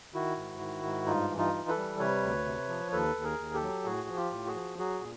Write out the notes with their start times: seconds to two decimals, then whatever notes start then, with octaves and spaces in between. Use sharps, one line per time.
0.14 D#3 E4 F#4
0.37 G#2
0.61 D#3
0.84 G#2
1.06 G2 D#4 F4
1.29 E3
1.38 D#4 F4
1.53 E3
1.68 A4 B4
1.77 G3
1.99 C3 B4 C#5
2.23 D2
2.45 C3
2.69 F3
2.92 D#2 A4 B4
3.16 D#2
3.24 G#4 A#4
3.39 D#2
3.54 G4 A4
3.62 F#3
3.85 A2 F#4 G#4
4.08 F3
4.16 F4 G4
4.32 A2
4.47 F#4 G#4
4.54 F3
4.78 F#3 F#4 G#4
5.01 A#2